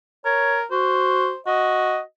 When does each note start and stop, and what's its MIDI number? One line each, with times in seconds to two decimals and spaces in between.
0.25 0.64 70
0.25 0.57 73
0.71 1.31 66
0.71 1.38 72
1.47 1.99 66
1.47 2.00 75